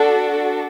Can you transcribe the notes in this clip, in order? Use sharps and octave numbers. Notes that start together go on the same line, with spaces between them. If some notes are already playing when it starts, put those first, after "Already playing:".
Already playing: D4 F#4 A4